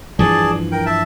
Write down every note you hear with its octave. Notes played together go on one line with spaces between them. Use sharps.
G2 E3 F3 G#4 D5 A5
A#4 G5
E5 A5